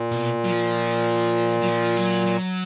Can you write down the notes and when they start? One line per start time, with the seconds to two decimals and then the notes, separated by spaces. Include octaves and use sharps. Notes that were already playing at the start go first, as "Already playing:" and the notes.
Already playing: A#2
0.12 B2
0.45 F#3
0.51 F3
1.62 F#3
1.67 F3
1.96 F#3
2.26 F#3